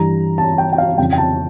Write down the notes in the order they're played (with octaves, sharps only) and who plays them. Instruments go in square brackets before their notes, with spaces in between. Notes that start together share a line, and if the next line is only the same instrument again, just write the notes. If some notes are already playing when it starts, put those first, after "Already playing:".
Already playing: [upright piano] G2 E3 G3 A#5
A5
G5
G5
F5
F2 C#3 F3 G5
G5
A5